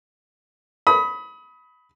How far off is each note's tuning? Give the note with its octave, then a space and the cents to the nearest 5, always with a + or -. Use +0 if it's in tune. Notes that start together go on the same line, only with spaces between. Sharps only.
B5 +0 D#6 +30